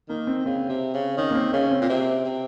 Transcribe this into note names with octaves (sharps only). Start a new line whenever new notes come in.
D#3 A#3
C4
C#3 C4
C3
C#3
D#3 C#4
A#3
C4
C#3 C#4
C4
A#2
C3
C3